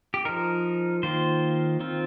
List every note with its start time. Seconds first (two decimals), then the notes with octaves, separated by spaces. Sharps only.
0.14 G4
0.25 F3 D#4 A#4
1.03 D#3 A#3 F4 C5
1.80 D#3 C4 F4